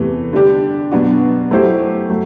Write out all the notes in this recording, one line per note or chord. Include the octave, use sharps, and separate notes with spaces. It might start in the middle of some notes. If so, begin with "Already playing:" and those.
Already playing: E2 C3 E3 A3
D3 G3 D4 G4
B2 F#3 B3 D4 F#4
F#3 A3 E4 G4 C5
F#3 A3